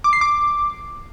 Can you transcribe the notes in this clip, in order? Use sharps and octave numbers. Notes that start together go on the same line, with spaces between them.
D6
C7
D6